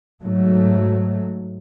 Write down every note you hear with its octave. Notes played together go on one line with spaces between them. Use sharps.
G#2 F#3 A3